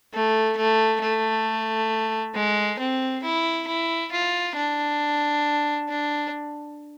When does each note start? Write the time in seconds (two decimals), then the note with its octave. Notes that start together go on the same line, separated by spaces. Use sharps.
0.13 A3
0.57 A3
1.01 A3
2.34 G#3
2.79 C4
3.23 E4
3.68 E4
4.12 F4
4.56 D4
5.88 D4